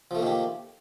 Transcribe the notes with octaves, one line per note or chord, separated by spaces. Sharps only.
D#3 F3 A3 A#3 G4